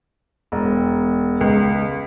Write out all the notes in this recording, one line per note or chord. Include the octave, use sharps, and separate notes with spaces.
E1
C#2